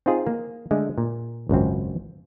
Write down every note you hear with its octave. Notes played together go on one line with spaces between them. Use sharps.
C4 D#4 F4 G#4
A#3
D3 G#3 A3
A#2
G#1 C#2 F#2 C4